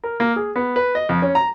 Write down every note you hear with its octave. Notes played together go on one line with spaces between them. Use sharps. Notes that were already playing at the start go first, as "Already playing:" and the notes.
A#4
A#3
G#4
B3
B4
D#5
F2
C#4
A#5